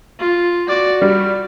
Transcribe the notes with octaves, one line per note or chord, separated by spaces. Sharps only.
F4
F#4 D5
G3 D5